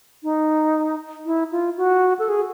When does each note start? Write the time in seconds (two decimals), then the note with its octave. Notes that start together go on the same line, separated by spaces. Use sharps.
0.23 D#4
1.26 E4
1.52 F4
1.78 F#4
2.19 A4
2.29 G#4